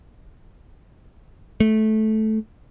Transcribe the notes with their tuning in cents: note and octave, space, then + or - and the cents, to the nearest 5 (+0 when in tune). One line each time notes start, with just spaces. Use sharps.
A3 -15